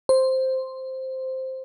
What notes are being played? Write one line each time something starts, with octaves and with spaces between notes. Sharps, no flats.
C5